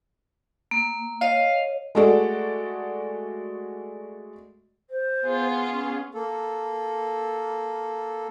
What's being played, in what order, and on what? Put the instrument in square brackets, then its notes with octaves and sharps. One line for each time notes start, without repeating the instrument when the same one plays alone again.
[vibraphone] A#3
[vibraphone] C#5 D#5 [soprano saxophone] F5
[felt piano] G#3 A3 F#4 A4 D5
[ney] C5
[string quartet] B3 F4 G#4
[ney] C#4
[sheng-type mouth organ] A#3 A4